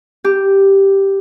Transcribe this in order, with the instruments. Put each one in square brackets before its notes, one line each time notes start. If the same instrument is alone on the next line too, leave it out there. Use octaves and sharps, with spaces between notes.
[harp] G4